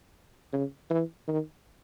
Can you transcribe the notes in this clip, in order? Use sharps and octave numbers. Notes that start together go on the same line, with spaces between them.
C#3
E3
D#3